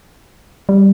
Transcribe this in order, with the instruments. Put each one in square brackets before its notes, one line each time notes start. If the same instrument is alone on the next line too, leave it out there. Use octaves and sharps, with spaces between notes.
[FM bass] G3